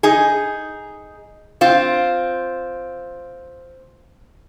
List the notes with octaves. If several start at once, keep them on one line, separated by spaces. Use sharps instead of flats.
D#4 G#4
C4 F4